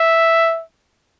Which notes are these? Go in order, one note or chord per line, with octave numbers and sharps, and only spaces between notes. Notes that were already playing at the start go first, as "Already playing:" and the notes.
Already playing: E5